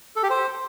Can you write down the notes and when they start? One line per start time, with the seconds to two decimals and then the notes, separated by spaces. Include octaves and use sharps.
0.16 A4
0.23 G4
0.30 C5